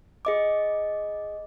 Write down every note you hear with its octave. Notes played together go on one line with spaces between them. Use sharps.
G#4 D#5 D6